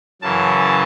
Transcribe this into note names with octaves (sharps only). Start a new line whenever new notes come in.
F#2 C#3 E3 A5